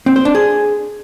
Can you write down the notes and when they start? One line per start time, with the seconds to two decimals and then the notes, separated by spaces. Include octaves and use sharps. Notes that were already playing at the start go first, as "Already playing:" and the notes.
0.06 C4
0.16 C5
0.25 D4
0.35 G#4